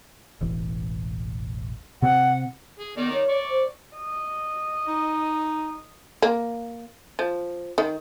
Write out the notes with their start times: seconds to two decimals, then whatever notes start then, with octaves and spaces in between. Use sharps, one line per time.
0.41 E1 A1 E3
2.02 C3 C4 F#5
2.79 G#4
2.97 D#3 B3 D#4 D5
3.13 C#5
3.28 D5 C#6
3.50 C5
3.96 D#5
4.87 D#4
6.22 A#3
7.19 F3
7.78 D#3